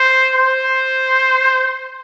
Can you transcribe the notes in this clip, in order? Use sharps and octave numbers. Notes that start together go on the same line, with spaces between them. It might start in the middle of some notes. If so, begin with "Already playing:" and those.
Already playing: C5
C5